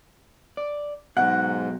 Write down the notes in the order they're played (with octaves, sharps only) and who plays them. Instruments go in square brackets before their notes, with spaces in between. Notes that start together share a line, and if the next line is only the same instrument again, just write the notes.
[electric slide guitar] D5
[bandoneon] G#2 [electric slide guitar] B2 F#3 [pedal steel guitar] G#3 G5 F#6 [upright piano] F#5